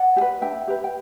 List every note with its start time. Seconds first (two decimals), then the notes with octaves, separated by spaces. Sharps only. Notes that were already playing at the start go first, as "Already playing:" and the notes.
Already playing: D5 F#5
0.16 G4
0.21 B4
0.42 D4 E5 G5
0.67 G4 B4
0.84 G5